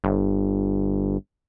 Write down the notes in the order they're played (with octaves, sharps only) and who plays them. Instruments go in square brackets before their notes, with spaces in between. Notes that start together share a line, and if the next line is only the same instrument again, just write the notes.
[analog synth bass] G1